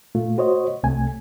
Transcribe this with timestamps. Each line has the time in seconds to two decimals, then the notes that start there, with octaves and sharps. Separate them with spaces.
0.15 A#2 A3 F4
0.38 F#4 C5 C#5 D#5
0.83 C2 C3 A3 G#5